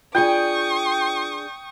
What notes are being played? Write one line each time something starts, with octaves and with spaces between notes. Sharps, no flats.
D4 F4 G#4 G5 C#6 D#6